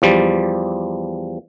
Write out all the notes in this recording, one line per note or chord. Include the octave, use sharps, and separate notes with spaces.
E2 F3 G3